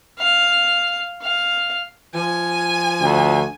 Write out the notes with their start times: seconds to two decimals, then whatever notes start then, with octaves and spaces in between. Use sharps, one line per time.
0.19 F5
1.23 F5
2.14 F3 G#5
3.01 D2